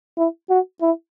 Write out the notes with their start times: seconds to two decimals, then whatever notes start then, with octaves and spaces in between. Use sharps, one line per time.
0.18 E4
0.50 F#4
0.82 E4